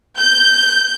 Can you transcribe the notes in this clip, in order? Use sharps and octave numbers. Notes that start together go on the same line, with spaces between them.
G6